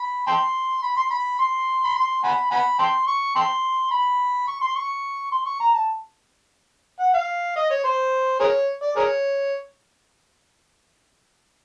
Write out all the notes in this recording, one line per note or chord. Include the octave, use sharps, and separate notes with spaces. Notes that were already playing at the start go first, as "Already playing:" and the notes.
Already playing: B5
G5 A5 C6
B5
C6
B5
C6
B5
C6
F#5 G#5 B5
F#5 G#5 B5
G5 A5 C6
C#6
G5 A5 C6
B5
C#6
C6
C#6
C6
C#6
A#5
A5
F#5
F5
D#5
C#5
C5
G#4 A#4 C#5
D5
G#4 A#4 C#5